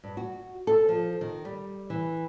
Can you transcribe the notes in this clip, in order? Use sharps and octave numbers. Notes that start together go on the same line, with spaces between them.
G2
F#4
A4
F3
D#3
G3
E3